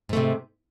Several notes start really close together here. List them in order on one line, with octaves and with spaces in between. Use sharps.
G#2 A3 C3